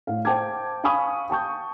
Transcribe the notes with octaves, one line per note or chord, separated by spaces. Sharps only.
A2 F5
C5 G5 A5 D6 G#6
F5 G#5 B5 C#6 D#6
G5 A5 C#6 G6